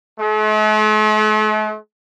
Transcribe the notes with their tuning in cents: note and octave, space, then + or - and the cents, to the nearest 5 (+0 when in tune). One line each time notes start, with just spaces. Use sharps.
A3 -45